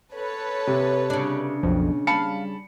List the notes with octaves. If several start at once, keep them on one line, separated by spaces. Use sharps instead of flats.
A4 B4 C#5
C3
C#3 D4
B1 F2 B2
G3 F5 A5 B5 C#7